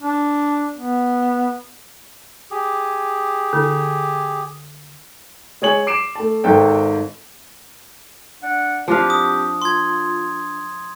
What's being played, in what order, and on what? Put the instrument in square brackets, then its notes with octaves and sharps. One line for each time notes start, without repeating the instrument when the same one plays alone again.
[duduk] D4
B3
[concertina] G4 G#4
[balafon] D3
[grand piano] G#3 G#4 C#5 F#7
D6 C7 D7 E7
A3 A5
G#1 G#2 A4 G5
[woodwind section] D4 D5 F#5
[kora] F3 D4 F5 [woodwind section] C4 G4
[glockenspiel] D#6
[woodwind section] F4 [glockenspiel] C6 G#6